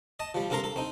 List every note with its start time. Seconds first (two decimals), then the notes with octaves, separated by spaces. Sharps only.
0.20 D#5 A5
0.34 F3 G3
0.50 G2 C4 A4 A#4 A#5 C6
0.64 A4
0.76 C4 D#4